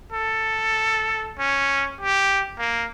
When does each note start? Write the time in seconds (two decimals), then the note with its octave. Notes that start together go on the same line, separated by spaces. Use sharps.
0.13 A4
1.39 C#4
2.01 G4
2.59 A#3